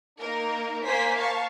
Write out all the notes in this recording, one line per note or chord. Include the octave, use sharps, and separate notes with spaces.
A#3 D#4 A#4
A#3 C5 G#5 B6
F5 A5 C#6